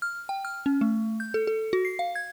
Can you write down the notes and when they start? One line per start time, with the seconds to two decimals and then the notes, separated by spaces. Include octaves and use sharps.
0.02 F6
0.29 G5
0.45 F6
0.66 C#4
0.81 A3
1.20 G6
1.34 A4
1.47 A4
1.73 F#4
1.85 C7
1.99 F5
2.15 G#6